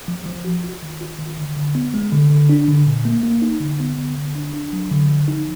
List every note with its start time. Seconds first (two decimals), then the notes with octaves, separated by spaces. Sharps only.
0.08 F3
0.26 F3
0.45 F#4
0.63 F4
0.83 D#3
1.01 F4
1.19 D#3
1.37 D3
1.57 D3
1.75 B3
1.94 G#3
2.12 D3
2.30 D3
2.49 D4
2.68 D3
2.87 A#2
3.05 A#3
3.23 A#3
3.42 D#4
3.60 D3
3.80 B3
3.98 D3
4.17 D3
4.35 D4
4.54 D4
4.73 F#3
4.91 D3
5.09 F3
5.28 D#4